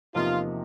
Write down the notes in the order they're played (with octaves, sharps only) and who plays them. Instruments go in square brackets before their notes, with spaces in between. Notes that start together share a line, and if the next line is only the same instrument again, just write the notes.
[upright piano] E2 C3 F3 A#3 D#4 [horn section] F4